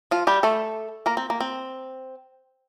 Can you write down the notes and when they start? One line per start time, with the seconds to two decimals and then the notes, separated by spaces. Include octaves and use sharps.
0.11 F3 F4
0.27 G3 G4
0.43 A3 A4
1.06 A#3 A#4
1.17 C4
1.30 A#3
1.40 C4